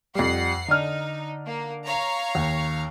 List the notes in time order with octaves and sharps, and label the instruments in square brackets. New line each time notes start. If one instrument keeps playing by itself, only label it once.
[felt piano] F2 G3 [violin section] F#5 C7
[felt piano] D3 D4 F6 [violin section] D#4
[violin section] A#3
C#5 F5 A#5
[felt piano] D#2